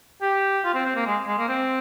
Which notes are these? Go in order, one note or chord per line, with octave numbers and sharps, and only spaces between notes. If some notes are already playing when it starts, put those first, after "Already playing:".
G4
F4
C4
C4
A#3
G#3
G#3
A#3
C4